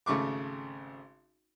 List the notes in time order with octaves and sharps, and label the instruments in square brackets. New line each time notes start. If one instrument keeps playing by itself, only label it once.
[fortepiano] G#1 C#3 A3 C#6 D6